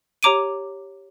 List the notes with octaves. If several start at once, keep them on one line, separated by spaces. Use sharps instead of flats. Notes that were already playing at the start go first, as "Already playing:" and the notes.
G4 C#5 A#5 D6 D7 D#7